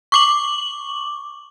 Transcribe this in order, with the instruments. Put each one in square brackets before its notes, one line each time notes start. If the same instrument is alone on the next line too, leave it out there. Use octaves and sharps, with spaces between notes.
[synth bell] C#6 D6 F#7